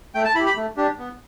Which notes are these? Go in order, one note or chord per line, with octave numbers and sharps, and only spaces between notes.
A3 G5
A5
E4 G4 B5
B5
A3
D4 G4
B3